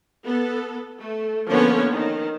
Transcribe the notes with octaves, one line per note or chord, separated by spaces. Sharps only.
B3 A4
A3
D3 F3 A#3 B3 C#4 C#5
D#3